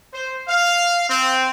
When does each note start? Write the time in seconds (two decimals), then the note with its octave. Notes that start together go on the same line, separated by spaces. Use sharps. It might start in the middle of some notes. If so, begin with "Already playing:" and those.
0.14 C5
0.47 F5
1.10 C4